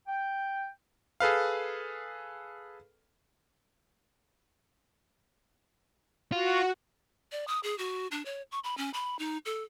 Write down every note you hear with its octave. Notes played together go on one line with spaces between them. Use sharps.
G5
G#4 A4 B4 F5
F4 F#4
D5
D#6
G#4
F#4
D4
C#5
C#6
B5
C#4
B5
D#4
A4